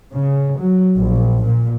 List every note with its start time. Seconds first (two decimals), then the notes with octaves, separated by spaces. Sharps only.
0.12 C#3
0.57 F#3
0.97 A#1
1.44 A#2